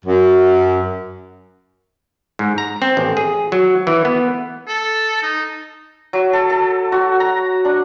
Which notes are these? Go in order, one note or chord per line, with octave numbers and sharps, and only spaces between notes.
F#2
G#2
A#5
C4
A1
G#4
F#3
E3
B3
A4
D#4
F#3
A4
A4
F#4
A#5
D4